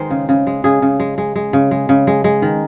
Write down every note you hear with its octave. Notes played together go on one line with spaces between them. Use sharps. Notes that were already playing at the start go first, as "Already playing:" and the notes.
Already playing: D#3 G#3 C5
C#3
C#3
G#3
C#3 G#4
C#3
G#3
G#3
G#3
C#3
G#3
C#3
G#3
G#3
D#3